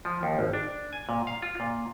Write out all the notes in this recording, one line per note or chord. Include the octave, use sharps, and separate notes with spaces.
F3
D#2
G#1
D4
G#5
A#2
F5
F4
A#2